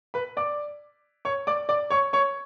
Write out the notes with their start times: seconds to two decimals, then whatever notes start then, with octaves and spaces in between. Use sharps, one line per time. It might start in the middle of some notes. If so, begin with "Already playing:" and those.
0.14 B4 B5
0.37 D5 D6
1.25 C#5 C#6
1.47 D5 D6
1.69 D5 D6
1.90 C#5 C#6
2.13 C#5 C#6